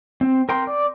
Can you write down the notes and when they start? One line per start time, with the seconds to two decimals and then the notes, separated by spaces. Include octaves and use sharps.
0.21 C4
0.49 A#4 G5 C6
0.67 D5